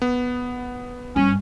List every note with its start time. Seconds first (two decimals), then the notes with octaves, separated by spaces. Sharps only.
0.02 B3
1.16 G2 C#4